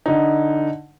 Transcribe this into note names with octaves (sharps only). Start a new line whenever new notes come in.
D3 D#4